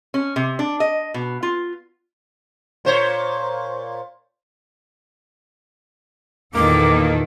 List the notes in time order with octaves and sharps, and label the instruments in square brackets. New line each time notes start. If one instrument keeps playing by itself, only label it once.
[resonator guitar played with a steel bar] C#4
C3
D4
D#5
B2
F4
[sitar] A#2 C5 C#5
[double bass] E2 [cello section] A#2 D#3 A4 [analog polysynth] A#3 [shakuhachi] D6